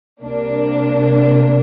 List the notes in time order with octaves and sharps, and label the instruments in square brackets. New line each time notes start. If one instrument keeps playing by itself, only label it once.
[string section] C2 C3 A#3 D4